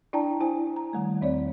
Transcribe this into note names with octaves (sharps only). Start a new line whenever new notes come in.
D4 E4 D5 G5 A5 A#5
E4 C5 G#5
A#5
D#3 G3 A3
E2 C4 C#5 D5